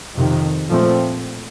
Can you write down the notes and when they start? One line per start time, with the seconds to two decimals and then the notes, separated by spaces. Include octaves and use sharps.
0.15 F2 C3 D#3
0.69 A#2 F3 A3 C4